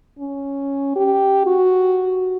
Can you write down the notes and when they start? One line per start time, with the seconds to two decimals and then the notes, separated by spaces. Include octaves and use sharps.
0.19 C#4
0.96 G4
1.46 F#4